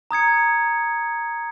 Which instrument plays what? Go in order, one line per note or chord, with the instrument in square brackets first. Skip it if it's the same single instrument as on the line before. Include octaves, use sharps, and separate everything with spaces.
[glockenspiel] A#5 D#6 G#6 C#7